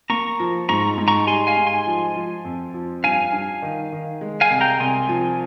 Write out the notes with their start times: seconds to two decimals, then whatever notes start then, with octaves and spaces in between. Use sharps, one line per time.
0.10 A#3 A#5 C#6
0.40 F3
0.69 G#2 A#5 C#6
0.98 G#2
1.08 A#5 C#6
1.27 G3 G#5 C6
1.47 F5 G#5
1.57 G#2
1.67 G#5 C6
1.87 F3
2.16 F3
2.45 F2
2.74 F3
3.04 G2 F5 G#5
3.33 G2
3.62 D#3
3.92 D#3
4.21 G#3
4.41 F5 G#5
4.50 C2
4.61 G5 A#5
4.80 C2 G#5 C6
5.09 F3